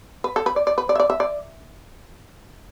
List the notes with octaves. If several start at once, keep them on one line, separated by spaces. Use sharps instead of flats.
B4
A4
B4
D5
D5
B4
D5
E5
D5
E5
D5